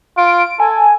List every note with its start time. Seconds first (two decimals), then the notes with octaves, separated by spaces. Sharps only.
0.17 F4 D7
0.60 A4 G#5